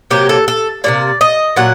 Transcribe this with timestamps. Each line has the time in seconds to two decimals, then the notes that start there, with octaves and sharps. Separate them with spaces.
0.11 C3 F#3 A#3 G4
0.29 A4
0.48 A4
0.84 C3 F#3 A#3 D5
1.21 D#5
1.56 A#2 F#3 F#5